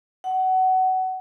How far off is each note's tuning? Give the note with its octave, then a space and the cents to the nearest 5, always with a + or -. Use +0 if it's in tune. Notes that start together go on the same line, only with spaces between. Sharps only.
F#5 +20